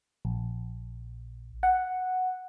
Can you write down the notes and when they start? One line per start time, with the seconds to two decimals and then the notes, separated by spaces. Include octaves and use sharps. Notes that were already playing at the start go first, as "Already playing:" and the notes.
0.25 A#1
1.63 F#5